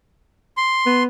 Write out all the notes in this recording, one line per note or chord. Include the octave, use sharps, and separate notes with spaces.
C6
B3